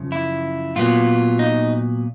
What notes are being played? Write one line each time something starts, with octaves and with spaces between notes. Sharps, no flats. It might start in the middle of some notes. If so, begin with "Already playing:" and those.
Already playing: F#2 C#3 F3
E4
A#2 F#3 B3 F4
D#4